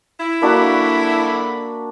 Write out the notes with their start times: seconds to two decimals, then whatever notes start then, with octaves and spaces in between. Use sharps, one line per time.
0.20 E4
0.42 D3 A#3 D4 F#4 B5